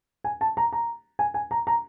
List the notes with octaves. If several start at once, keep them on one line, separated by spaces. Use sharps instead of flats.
G#5
A5
A#5
A#5
G#5
G#5
A#5
A#5